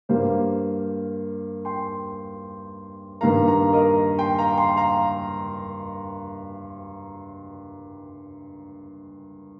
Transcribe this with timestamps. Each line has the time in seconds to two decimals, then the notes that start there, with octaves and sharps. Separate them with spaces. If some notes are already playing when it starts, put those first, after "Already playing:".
0.09 G2 G3 A#3 C5 F5
1.65 G5 C6
3.21 G2 D#3 A#3 F5 A#5
3.47 F5 A#5
3.73 A#4 D#5
4.19 G5 C6
4.38 F5 A#5
4.58 G5 C6
4.76 F5 A#5